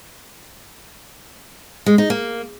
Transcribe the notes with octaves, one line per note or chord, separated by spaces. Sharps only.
G#3
D#4
A#3